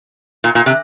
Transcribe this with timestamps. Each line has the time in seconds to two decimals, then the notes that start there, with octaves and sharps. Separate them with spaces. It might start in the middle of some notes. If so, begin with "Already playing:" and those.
0.44 A#2
0.55 A#2
0.66 C3